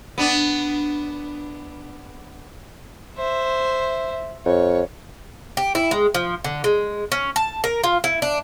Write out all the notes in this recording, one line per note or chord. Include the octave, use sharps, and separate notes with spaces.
B3 D4
C5 E5
F2 C#5
G4
E4
G#3
F3
D3
G#3
C#4
A5
A#4
F4
E4
D4